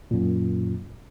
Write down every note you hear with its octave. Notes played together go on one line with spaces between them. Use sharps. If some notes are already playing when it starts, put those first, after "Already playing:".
F#2 A#2